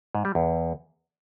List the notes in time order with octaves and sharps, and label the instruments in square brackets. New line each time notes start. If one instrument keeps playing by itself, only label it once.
[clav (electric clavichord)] G#2
G3
E2